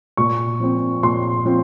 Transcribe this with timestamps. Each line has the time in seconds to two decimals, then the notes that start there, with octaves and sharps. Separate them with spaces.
0.17 A#2 C#6
0.60 F3 C4
1.03 A#2 C6
1.45 F3 C4